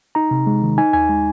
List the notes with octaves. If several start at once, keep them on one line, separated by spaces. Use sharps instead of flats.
D#4 A#5
C3
G#3
D#3
D#4 G#5
D#2 G#5
G#3